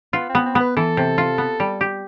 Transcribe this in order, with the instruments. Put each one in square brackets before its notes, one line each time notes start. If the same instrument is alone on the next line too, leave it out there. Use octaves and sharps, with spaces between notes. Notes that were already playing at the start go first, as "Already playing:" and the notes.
[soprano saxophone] B3 [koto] F4
[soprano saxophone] C4
[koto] B3
[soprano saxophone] C4
[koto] B3 [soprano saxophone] B4
[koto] E3 [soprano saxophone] A4
[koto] C3
F4
B3
G3
G4